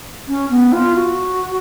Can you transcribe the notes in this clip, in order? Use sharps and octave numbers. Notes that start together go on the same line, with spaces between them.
C#4
B3
F4
F#4